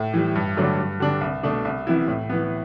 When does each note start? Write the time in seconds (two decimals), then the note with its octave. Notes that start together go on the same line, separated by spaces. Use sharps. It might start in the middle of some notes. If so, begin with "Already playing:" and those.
Already playing: A2
0.14 E3 G3
0.35 G2
0.57 D3 F#3 A3 D4
0.78 G2
1.00 D3 G3 D4
1.21 C2
1.43 B2 A3 D4
1.65 C2
1.87 C3 E3 B3 E4
2.08 A2
2.29 E3 B3